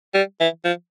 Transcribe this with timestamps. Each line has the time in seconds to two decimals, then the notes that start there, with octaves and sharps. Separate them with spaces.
0.14 G3
0.40 E3
0.64 F3